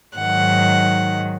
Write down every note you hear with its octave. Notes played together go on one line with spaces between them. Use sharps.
G#2 D#3 F#3 F#5